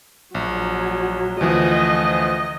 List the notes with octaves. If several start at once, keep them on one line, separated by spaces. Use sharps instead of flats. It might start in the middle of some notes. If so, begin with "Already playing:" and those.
A#1 F#3
D2 E3 F3 D#5